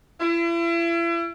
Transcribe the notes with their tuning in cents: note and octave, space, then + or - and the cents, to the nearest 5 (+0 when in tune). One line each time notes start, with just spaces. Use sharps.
E4 +40